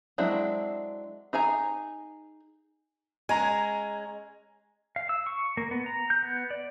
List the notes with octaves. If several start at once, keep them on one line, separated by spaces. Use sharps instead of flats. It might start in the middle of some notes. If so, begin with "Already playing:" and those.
F#3 G#3 C4 D4 E4
D#4 G#4 G#5 A#5
G#3 C#4 G#5 A#5
F5
E6
C#6
A#3
B3
A#5
G6
B3
D5